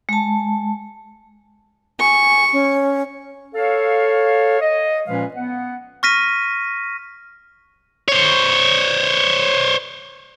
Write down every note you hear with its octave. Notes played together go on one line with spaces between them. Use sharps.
G#3 A5
G#5 C#6
C#4
A4 C#5 F5
D#5
A#2 F3 G#3 C#4 B4 F5
B3 F#5
C#6 F6 A#6 B6 D#7
C5 C#5